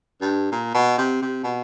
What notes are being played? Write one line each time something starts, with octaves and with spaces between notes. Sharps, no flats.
G2
A#2
B2
C3
C3
B2